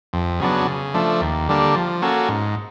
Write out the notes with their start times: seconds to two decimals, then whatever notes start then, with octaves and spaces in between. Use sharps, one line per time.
0.13 F2
0.40 C#3 F#3 B3 D4
0.67 C#3
0.94 F3 A3 D4
1.21 D#2
1.49 D3 G3 A#3 D4
1.75 F3
2.02 A#3 C#4 F#4 A4
2.29 G#2